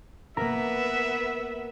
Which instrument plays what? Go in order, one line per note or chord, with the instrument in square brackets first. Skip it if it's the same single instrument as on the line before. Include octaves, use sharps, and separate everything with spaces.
[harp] A#3 A#4 [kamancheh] B3 B4 [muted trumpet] E5